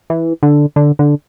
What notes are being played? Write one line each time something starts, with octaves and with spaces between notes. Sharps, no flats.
E3
D3
D3
D3